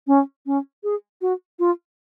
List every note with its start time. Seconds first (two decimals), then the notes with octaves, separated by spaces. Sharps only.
0.07 C#4
0.46 C#4
0.84 G#4
1.21 F#4
1.59 F4